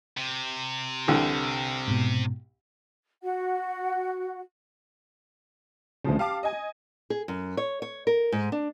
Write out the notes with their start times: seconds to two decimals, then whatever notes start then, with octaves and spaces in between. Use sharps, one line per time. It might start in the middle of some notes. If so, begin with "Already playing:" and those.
0.17 C3
1.08 C2 D3 E3
1.88 G#2 B2
3.23 F#4 F#5
6.04 D2 C#3 F3 G#3
6.19 G4 F5 A5 D6
6.43 D#5 G#5
7.10 G#4
7.28 F#2
7.57 C#5
7.82 C#5
8.07 A#4
8.32 G#2
8.52 D4